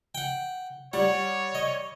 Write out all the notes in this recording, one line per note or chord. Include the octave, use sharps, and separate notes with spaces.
F#5 G5
G3 C#5 F#5
D#5